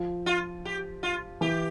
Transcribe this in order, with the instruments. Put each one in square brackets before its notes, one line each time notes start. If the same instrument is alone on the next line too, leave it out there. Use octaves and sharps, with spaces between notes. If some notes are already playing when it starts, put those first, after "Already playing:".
Already playing: [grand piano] F3
[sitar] F4
G4
F4
[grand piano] E3 [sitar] G4